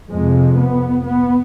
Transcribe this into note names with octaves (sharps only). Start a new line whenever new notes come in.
F2 C3 G#3
B3
B3